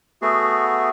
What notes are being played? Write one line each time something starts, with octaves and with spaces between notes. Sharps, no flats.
A3 B3 F#4 G#4